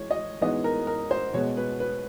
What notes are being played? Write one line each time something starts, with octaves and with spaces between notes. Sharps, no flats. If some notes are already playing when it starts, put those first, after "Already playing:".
Already playing: E3 G#3 C#5
D#5
E3 G#3 B3 D#4 D#5
A#4
A#4
C5
B2 G#3 B3 C#5
B4
B4